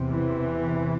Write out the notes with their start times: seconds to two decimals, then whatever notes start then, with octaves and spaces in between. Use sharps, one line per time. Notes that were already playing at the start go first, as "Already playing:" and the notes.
Already playing: E2 C3
0.10 E3